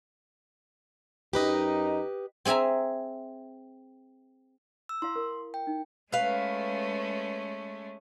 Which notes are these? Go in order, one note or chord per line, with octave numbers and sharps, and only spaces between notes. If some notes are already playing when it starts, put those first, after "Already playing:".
F#2 D#4 G4 B4 D#5
C4 G#4 E5 G#5 A#5
E6
E4 F5 C6
A#4
G5
D#4
G#3 A3 C#4 B4 F5